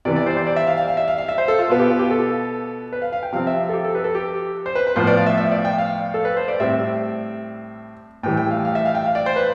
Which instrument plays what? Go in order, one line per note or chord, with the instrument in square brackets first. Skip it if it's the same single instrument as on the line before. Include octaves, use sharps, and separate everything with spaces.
[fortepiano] C3 E3 B3 D5
D5
C5
D5
C5
D5
E5
F5
F5
F5
E5
F5
F5
E5
C5
A4
F4
B2 B3 F4
G4
F4
G4
A4
B4
F5
F5
G5
C3 F3 C4 F5
E5
A4
G4
A4
B4
A4
G4
C5
B4
B4
A2 F3 B3 C5
D5
F5
E5
E5
D5
G5
F5
A4
B4
C5
D5
A2 G3 C4 E5
A2 E3 G3 G5
G5
F5
F5
E5
F5
G5
F5
D5
C5
B4